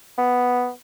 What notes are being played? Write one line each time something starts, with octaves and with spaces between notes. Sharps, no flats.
B3